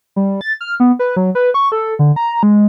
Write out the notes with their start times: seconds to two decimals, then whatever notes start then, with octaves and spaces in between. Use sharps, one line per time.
0.16 G3
0.41 A6
0.61 F6
0.80 B3
0.99 B4
1.17 F#3
1.35 B4
1.54 C#6
1.72 A4
1.99 D3
2.16 A#5
2.43 G#3